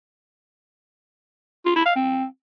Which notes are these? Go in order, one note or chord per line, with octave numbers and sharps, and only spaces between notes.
F4
E4
F5
C4